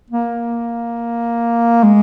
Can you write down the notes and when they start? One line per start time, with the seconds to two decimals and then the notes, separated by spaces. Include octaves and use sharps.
0.10 A#3
1.84 G#3